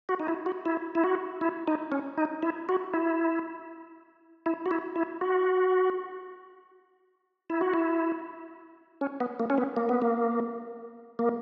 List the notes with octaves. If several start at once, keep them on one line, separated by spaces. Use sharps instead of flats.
F#4
D#4
E4
F#4
E4
E4
F#4
E4
D#4
C#4
D#4
E4
F#4
E4
E4
F#4
E4
E4
F#4
E4
F#4
E4
C#4
B3
A#3
C#4
B3
A#3
B3
A#3
A#3